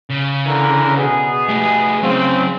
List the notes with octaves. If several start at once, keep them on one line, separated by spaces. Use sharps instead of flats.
C#3
D3 E3 A#4
B2 B3 G#4
A3 G4
C#3 F#3 C4 F5